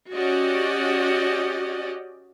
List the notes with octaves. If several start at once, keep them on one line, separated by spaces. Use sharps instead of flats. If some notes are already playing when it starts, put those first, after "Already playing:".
C#4 F#4 G4 D5 D#5